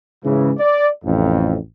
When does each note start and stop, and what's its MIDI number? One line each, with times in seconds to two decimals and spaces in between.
0.25 0.51 44
0.25 0.51 49
0.25 0.51 52
0.58 0.87 74
1.04 1.56 33
1.04 1.56 41